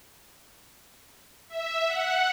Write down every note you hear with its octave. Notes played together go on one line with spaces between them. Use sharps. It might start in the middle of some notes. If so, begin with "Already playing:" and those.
E5
F#5